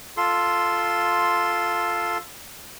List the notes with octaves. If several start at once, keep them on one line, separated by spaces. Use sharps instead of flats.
F4 A4 C6